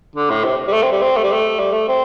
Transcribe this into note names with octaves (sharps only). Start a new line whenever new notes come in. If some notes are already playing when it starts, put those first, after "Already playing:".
D3
A2
C3
G3
A3
C4
G3
C4
A3
G3
A3
G3
A3
C4